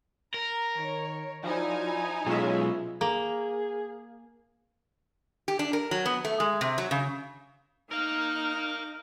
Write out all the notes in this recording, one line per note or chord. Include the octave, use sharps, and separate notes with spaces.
A#4 A#5
D#3 C#5
F3 F#3 D#4 E4 F#4 D5 G#5
B1 G#3 C#4 F4 E5
A#3 G#4
G4
D4
A#4
F#3
B3
A3
G#3
C3
F#3
C#3
D#4 A#4 F5 F6